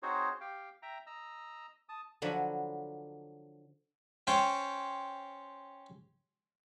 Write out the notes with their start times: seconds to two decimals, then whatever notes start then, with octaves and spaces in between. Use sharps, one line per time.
0.03 C4 D#4 F#4 G#4 C5 C#5
0.41 G4 F5 G5
0.82 E5 G5 A#5
1.07 D#5 A#5 E6
1.89 A5 D#6
2.22 D3 F3 F#3 B5
4.27 C#4 C5 C#5 G5 A5